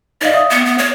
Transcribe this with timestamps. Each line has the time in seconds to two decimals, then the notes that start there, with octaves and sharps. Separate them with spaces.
0.21 D#4 D5 D#5 F5
0.34 E5 D#6
0.50 B3
0.65 B3
0.78 C#5